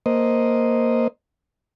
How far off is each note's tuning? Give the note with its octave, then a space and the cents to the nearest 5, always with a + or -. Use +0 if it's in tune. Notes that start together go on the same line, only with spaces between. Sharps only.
A#3 +0 C5 -5 D#5 +0